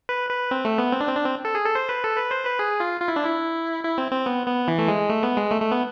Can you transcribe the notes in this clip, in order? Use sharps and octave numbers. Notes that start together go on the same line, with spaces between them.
B4
B4
C4
A3
B3
C4
D4
C4
D4
C4
A4
G#4
A4
C5
B4
A4
B4
C5
B4
G#4
F4
F4
E4
D4
E4
E4
C4
C4
B3
B3
E3
A3
G#3
A3
B3
G#3
A3
A3
B3